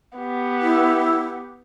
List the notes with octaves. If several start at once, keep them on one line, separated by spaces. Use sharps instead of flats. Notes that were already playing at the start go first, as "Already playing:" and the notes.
B3 G4
E4